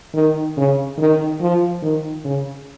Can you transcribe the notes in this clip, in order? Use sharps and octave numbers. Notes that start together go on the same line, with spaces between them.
D#3
C#3
D#3
F3
D#3
C#3